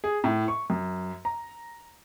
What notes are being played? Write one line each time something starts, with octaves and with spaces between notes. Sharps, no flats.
G#4
A2
C#6
F#2
A#5